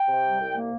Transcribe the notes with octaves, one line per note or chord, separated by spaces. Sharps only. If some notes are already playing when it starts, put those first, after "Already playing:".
Already playing: G5
C3
G3
C2
A#3